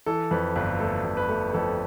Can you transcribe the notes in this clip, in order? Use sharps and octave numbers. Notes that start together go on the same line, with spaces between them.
E3 A4
F2 B4
G1 B4
A3 A4
G1
B4
A3
F2 A4